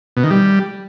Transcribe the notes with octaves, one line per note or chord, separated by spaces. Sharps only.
B2
D#3
G3